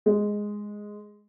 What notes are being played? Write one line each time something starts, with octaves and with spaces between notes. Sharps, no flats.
G#3